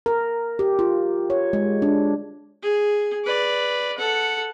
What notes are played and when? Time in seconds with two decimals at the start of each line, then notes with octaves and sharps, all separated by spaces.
0.06 A#4
0.59 G4
0.79 F4
1.30 C#5
1.53 G#3
1.82 D4
2.62 G#4
3.24 B4 D5
3.98 A4 F#5